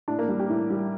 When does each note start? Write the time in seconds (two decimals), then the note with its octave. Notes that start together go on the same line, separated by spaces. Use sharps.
0.08 A2 D4
0.19 A#3
0.29 G3
0.39 G4
0.49 A2
0.70 G3